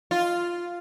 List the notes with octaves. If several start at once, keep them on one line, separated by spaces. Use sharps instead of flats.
F4